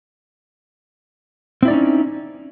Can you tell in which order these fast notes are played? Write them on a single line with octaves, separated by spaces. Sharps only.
C4 E4 D5 D#4 C#4